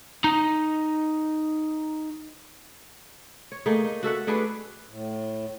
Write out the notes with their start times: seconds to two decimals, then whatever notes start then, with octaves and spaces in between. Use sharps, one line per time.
0.24 D#4 A#5
3.52 C#5
3.66 A3 A#3 D#4 G#4
3.84 D#4
4.03 F#4 A4 E5 F#5
4.27 A3 D4 G#4 B4
4.88 A2